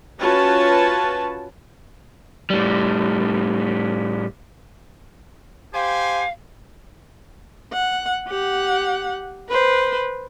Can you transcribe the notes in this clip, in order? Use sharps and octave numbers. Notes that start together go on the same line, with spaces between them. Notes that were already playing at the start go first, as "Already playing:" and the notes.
C#4 F4 F#4 B4 C#5 A5
A2 G3
G4 C5 F5 G#5
F#5
G4 F#5
B4 C5